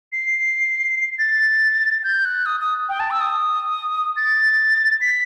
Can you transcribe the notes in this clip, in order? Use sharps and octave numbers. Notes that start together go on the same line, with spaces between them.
C7
A6
G6
F#6
D#6
D#6
G5
A5
E6
D#6
A6
B6